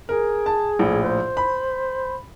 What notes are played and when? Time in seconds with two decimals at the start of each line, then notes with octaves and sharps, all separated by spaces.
0.09 G#4 A#4
0.46 A5
0.79 A#1 A2
1.03 C5
1.37 B5